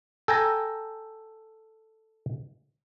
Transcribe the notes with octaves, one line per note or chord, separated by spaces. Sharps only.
A4 G5 G#5 A#5